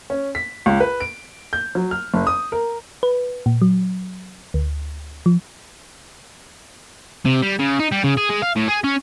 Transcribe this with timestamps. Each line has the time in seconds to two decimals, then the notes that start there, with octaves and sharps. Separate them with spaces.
0.10 C#4
0.35 B6
0.66 C#2
0.80 B4
1.00 D7
1.53 G6
1.75 F#3
1.91 F6
2.14 F#1
2.27 D#6
2.52 A#4
3.03 B4
3.46 A#2
3.62 F#3
4.54 D2
5.26 F3
7.26 C3
7.42 G3
7.59 C#3
7.79 D#4
7.92 G3
8.04 C#3
8.17 G#4
8.30 G#3
8.42 F5
8.56 A2
8.68 G#4
8.84 C#4